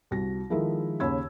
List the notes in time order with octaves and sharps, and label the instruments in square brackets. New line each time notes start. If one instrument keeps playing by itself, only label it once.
[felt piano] C2 F#4 A#6
D#3 F3 G#3 E4 A4 A#4
D#2 C#3 C#5 B5 E6 G#6